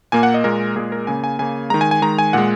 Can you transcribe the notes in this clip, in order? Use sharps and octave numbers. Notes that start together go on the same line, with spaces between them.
A#2 A#3 G#5
F#5
D#5
A#2 G#3 A#4
A#2 G#3 G#4
A#4
C#3 A#3 G#5
G#5
C#3 A#3 G#5
D#3 G#3 A#5
G#5
G#5
D#3 G#3 A#5
G#5
A#2 G#3 F#5